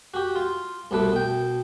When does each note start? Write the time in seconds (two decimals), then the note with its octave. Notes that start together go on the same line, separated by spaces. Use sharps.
0.14 F#4 G4
0.36 F4
0.91 C2 B2 A3 B4 D6
1.12 B2 G5